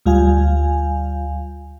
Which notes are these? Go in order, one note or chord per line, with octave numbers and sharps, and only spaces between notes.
D2 G3 F4 F5 G#5